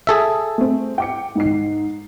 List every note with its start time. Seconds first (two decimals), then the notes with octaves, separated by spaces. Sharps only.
0.07 G#4 A4 E5
0.58 A3 C4
0.98 G5 D6 C#7
1.35 G#2 D#4 C7